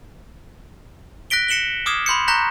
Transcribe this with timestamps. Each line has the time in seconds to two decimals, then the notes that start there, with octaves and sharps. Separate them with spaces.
1.30 F#6 A#6 B6 D7 G7
1.48 A#6 C#7 E7 F#7 G7
1.86 D6 D#6 F6 G#6 C7 E7
2.06 B5 C6 G6 C#7
2.28 A#5 C#6 F#6 G6 A#6 B6